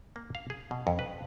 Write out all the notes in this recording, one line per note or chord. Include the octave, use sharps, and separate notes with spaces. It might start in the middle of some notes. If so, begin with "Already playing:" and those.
A#3
F5
G#4
B2
F2
B4